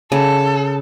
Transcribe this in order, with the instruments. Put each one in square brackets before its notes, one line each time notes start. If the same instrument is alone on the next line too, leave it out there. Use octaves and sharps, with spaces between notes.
[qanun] C#3 [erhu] A4